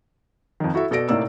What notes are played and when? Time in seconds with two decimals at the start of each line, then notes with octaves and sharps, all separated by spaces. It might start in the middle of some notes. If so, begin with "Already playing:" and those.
0.60 F2 D#3
0.74 E4 F#4 A4 E5
0.91 B2 A4 D5 A#6 D7
1.09 A2 C3 A#3 D#4 D5 E6